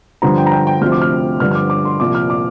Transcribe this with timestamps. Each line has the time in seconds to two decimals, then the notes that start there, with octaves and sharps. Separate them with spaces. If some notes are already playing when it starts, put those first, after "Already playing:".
0.22 G2 D3 F3 A#5
0.38 G5
0.46 A#5
0.52 G5
0.67 G5
0.81 D2 C3 F3 F6
0.92 D6
1.02 F6
1.40 G2 D3 F3 F6
1.51 F6
1.55 D6
1.70 D6
1.85 C6
2.00 C2 A#2 F3 D6
2.15 F6
2.30 D6